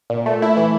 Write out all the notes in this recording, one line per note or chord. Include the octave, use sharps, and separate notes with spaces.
A#2
A3
E4
E3